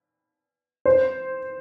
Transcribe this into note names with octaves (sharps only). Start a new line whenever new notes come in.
C5